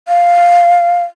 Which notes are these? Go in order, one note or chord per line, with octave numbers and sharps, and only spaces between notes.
F5